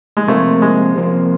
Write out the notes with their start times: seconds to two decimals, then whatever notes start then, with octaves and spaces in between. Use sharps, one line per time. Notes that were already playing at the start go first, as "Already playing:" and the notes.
0.17 G#3
0.28 C3 F3 A3 A#3
0.62 G#3
0.96 C3 F3 A#3